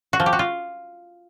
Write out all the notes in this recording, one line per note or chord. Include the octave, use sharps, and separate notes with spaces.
F#4
F3
G4
F#4
F4